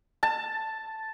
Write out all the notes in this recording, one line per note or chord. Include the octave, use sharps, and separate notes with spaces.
A5